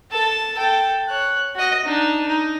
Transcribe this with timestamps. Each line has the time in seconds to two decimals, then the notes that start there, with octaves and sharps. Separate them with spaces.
0.11 A4 A5
0.57 A4 G5
1.08 C#5 F#6
1.55 F#4 D#5
1.85 D4 D#4
2.28 D#4